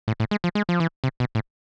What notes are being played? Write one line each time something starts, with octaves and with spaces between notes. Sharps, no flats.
A2
A2
G#3
F3
G#3
F3
E3
C3
B2
A2